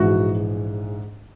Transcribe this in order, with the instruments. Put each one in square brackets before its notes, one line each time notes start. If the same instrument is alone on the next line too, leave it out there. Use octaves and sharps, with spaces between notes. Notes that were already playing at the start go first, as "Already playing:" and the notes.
Already playing: [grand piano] A#1 G#2 E3 F#4